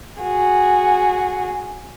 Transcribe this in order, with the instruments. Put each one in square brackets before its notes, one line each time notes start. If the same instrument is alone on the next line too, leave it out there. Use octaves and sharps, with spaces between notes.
[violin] F#4 G#4